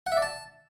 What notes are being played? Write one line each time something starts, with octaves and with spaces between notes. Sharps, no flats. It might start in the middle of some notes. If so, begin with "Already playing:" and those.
F#5
E5
D5
A5